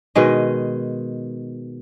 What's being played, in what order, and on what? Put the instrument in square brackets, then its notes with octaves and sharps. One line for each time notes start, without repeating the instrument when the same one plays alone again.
[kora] B2 D#3 G#3 D#5